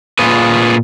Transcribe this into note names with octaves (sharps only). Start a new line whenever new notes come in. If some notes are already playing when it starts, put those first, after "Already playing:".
A#2 F4 G#4 B4